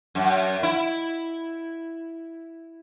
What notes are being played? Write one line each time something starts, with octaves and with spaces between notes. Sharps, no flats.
F#2
E4